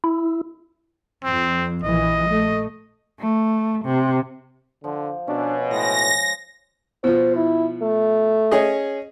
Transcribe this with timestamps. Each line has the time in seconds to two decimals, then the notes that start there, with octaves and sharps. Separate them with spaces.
0.04 E4
1.24 F2 C4
1.83 A#1 E3 D#5
2.28 A3
3.20 A3
3.85 C3
4.84 D3 F3
5.28 B2 C#4 D4
5.71 A2 G#3 A#6
7.04 B2 F3 C5
7.36 E4
7.82 A3
8.51 C#4 G#4 D#5